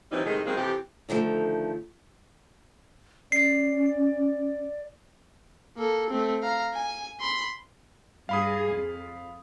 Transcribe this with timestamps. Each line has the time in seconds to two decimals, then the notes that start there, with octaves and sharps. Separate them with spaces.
0.12 A#2 E3 F#3 G3 C4 D#4
0.25 A2 C3 D#3 G#3
0.46 D#3 F#3 G#3 A#3 C4
0.57 F2 C3 E3 G4
1.09 D3 D#3 F3 G#3 A3
3.32 C#4 D5 C7
5.77 A#3 A4
6.10 A3 C4
6.43 F5 A#5
6.74 G#5
7.20 B5 C6
8.29 G2 G#4 F5 B5 D#6
8.73 F2